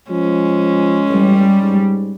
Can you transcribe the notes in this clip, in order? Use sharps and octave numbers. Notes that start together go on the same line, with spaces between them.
F3 G#3 C#4
A1 G3
G#2